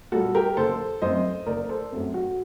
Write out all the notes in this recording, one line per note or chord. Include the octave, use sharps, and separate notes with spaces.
A#2 G3 A#3 F#4 A4
G4 A#4
F#1 A4 C5
F#2 F#3 A3 C4 C5 D#5
F#1 A#4 D5
A4 C5
F#2 F#3 A3 C4
F#4